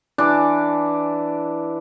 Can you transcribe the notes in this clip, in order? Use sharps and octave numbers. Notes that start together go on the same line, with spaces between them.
E3 D4 D5